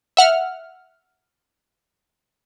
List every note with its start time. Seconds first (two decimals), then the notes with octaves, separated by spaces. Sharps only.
0.17 E5 F#5 F6